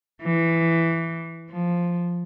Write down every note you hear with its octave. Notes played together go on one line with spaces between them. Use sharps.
E3
F3